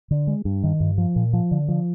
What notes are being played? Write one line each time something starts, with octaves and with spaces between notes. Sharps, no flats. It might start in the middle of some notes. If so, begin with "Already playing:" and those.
D3
G#3
G2
D#3
G2
F3
A#2
F3
D3
F3